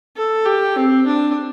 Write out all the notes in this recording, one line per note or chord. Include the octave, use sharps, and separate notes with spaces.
A4
G4
C4
D4